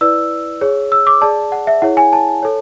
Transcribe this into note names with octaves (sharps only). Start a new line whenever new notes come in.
E4 B4 D5 E6
G#4 C#5
E6
D6
G#4 D5 A5
F#5
E5
E4 G#4 C#5 F#5
G#5
A5
A4 C#5